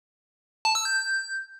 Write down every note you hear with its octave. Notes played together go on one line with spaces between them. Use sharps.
A5
E6
G6